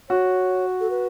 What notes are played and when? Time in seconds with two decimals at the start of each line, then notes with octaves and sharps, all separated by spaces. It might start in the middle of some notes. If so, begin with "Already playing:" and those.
0.09 F#4 C#5
0.80 A4
0.90 B4